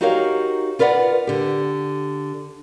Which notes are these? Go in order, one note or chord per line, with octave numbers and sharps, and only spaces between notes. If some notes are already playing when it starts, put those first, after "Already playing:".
D#4 F#4 G4 A#4 C#5 F5
F4 A#4 B4 D5 D#5 F#5
D3 G4